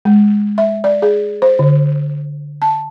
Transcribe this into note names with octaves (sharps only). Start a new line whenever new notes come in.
G#3
E5
D5
G#4
C5
D3
A5